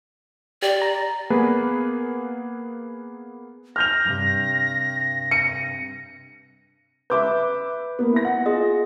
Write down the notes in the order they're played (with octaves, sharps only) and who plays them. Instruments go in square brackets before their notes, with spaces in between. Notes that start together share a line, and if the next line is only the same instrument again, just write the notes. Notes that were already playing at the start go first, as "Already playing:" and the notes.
[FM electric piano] G4 [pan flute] D5
[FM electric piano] A#5
[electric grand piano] A#3 B3 G#4 B4
[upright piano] F6 G6 F7 [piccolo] A#6
[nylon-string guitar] G2 C3
[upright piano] C#7 D#7
[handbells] B4 [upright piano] E5 D6 G6
[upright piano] A#3 B3
E4 A#6
F#5
[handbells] F4 G#4 D#5